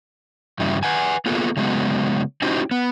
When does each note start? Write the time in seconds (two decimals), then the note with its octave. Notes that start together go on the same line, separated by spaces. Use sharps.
0.59 E2 G2 C#3 E4
0.83 B4 F#5 G#5
1.26 A#3 B3 F4 G#4 A4 B4
1.57 C#3 F#3 G#3 A3 B3
2.42 C#4 D#4 E4 F#4 G4 C5
2.71 B3